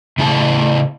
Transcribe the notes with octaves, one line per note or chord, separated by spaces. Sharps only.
A2 C#3 E4 G#4 A5